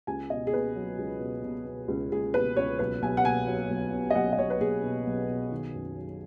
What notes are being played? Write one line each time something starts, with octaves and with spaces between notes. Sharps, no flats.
C#2 G#5
B2 D#5
G#4
B2 B4
F#3
C#2
B2
B2
B2
C#2
C#2 G#4
B2 B4
C#2 C#5
B1 B4
B1 G#5
F#5
B2 G#5
F#3
B1
B2
D#5
B1 F#5
D#5
B1 C#5
B4
B1 G#4
B2
B1
B2
D#3
F#2
F#3